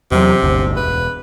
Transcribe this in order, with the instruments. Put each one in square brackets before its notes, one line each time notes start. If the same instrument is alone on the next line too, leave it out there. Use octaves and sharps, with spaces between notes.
[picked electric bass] E2 F#3 [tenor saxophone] C3
[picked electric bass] G1 D2
[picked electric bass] E1 [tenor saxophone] B4